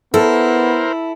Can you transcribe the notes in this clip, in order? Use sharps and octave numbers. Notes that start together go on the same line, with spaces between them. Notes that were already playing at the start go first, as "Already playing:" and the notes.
B3 E4 A4 A#4 C5